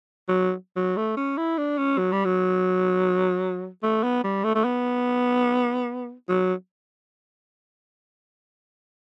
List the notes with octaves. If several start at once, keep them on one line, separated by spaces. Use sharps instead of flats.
F#3
F#3
A3
C#4
E4
D4
C#4
F#3
G3
F#3
A3
B3
G3
A3
A3
B3
F#3